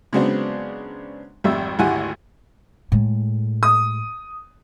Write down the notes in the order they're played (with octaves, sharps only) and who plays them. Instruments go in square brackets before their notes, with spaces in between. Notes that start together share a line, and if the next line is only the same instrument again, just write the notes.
[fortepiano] C#3 F#3 G#3 B3 C4 D4
G#1 F2 G3 E5
G#1 D2 E4 G4 F#5 G#5
[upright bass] A2 G#3
[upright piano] D#6